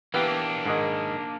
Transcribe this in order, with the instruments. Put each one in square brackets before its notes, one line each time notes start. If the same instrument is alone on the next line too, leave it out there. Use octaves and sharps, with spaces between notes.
[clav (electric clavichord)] E3 B3 G4 [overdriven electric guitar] A#3 D4
[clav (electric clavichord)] G#2 D#3 G#3